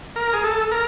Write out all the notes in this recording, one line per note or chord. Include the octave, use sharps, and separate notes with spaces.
A#4
G#4
A4
A#4